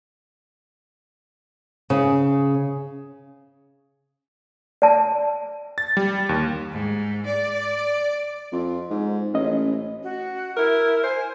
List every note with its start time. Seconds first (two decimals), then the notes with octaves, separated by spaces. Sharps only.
1.90 C#3
4.82 D5 A5
5.78 A6
5.97 G3
6.29 D#2
6.71 G#2
7.26 D5
8.52 F2
8.90 G#2
9.34 A1 C#4 D#5
10.03 F#4
10.57 E4 A#4
11.04 C5 G#5